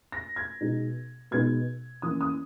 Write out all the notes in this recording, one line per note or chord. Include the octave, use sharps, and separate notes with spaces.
A#6
G#6
B2 G#3 B3 D#4
B2 G#3 B3 D#4 G#6
E3 A#3 C#4 D#6
D#6